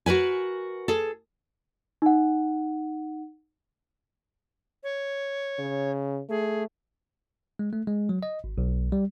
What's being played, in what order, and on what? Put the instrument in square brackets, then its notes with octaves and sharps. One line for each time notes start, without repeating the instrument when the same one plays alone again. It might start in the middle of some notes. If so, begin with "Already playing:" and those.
[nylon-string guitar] F#4 A#4 B4 G#5
G#4 A4
[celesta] D#4 F#5
[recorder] C#5
[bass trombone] C#3
[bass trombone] A3 [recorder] G#4
[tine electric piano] G#3
A3
G#3
F#3
D#5
G#1
B1
G3